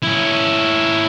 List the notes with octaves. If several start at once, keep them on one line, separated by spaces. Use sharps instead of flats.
C#4 E4